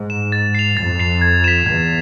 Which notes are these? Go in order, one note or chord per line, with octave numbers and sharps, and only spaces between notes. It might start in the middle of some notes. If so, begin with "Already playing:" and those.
Already playing: G#2
E7
A6
C7 F7
F2 A6
C7 F7
G#6
B6 E7
E2 G#6